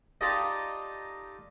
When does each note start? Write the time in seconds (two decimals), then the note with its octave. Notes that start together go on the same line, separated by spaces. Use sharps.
0.21 D#4 F4 G4 A4 D5 D#5